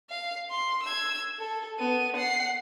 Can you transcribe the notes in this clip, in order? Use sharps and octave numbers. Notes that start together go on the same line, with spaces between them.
F5
C6
E6 G#6
A4
B3 D#7
F#5 C7